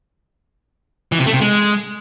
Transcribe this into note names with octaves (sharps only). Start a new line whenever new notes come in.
E3
C3
A3
C3
G#3